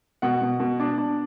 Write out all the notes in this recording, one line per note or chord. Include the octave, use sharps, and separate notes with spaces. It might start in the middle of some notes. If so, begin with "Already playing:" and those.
B2 F#5
B2
B2
D4
D4